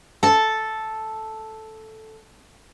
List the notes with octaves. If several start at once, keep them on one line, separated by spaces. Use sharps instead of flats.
A4 A5